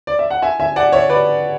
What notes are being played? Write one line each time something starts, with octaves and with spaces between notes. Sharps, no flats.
D5
E5
F#5
E5 G#5
E5 G#5
D5 F#5
C#5 E5
B4 D5